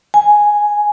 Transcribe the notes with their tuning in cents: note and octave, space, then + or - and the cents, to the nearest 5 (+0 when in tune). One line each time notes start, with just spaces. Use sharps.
G#5 +0